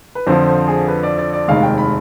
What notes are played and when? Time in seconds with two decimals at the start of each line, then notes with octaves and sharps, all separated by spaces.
0.15 B4
0.27 F2 D3 F3 C5
0.47 C5
0.68 G#4
0.88 B4
1.03 D5
1.18 D5
1.33 D5
1.48 F1 D#2 D#3 G#3 F5
1.63 G5
1.78 B5